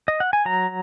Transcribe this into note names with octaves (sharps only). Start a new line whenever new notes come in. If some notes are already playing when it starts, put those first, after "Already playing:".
D#5
F#5
G#5
F#3 A#5